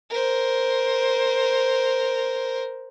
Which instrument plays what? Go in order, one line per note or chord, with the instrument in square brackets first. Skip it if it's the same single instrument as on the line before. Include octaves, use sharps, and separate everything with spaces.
[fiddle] A#4 C5